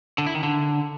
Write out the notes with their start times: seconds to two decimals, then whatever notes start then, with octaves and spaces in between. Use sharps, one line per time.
0.18 D3
0.27 E4
0.35 D#3
0.43 D3